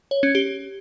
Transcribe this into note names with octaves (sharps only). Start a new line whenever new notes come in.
C#5
C#4
G4